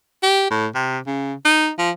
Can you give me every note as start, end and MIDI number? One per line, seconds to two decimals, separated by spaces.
0.23 0.49 67
0.51 0.67 45
0.75 0.98 48
1.07 1.33 49
1.45 1.70 63
1.79 1.91 53